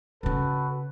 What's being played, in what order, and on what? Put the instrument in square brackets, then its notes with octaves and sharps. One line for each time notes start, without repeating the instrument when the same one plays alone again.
[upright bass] C#3 C#4 [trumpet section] F#4 A4 B4